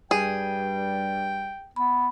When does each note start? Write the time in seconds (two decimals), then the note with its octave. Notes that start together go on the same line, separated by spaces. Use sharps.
0.11 G2 G3 G#4 G5
1.76 B3 B5